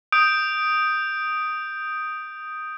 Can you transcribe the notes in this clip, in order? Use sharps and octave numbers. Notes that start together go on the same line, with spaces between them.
D#6 G6 D7